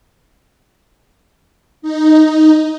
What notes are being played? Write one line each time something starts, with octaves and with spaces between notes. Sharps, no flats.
D#4